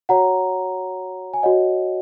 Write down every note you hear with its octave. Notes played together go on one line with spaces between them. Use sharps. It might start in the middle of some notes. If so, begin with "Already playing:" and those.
F#4 C#5 F#5 A#5
G#5
F#4 C#5 D#5 F#5